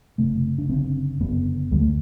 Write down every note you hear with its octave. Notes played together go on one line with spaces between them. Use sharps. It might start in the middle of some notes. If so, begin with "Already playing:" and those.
F#1 E2 C3 A3
D4
F#1 F#2 D3 C4
F#1 F#2 D3 B3
D2 D3 G3
A3